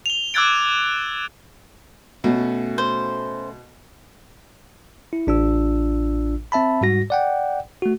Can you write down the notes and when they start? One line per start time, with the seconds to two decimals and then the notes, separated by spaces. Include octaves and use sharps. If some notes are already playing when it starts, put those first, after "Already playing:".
0.06 F7 G7
0.34 D6 E6 F#6 G#6 A6 D7
2.24 B2 A3 C#4 F#4
2.78 C5
5.13 E4
5.27 A1 D4 F4 E6
6.52 C4 E5 A5 B5
6.81 G#2 G3 F#4 A#6
7.10 D5 F#5 G5
7.82 A3 F#4